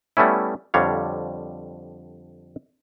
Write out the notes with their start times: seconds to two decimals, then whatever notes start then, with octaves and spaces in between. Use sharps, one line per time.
0.17 G3 A3 B3 C#4 E4
0.74 F2 D3 G3 C#5 F5